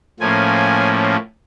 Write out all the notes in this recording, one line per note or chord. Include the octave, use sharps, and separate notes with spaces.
A2 F3 A#3 C#4 G#5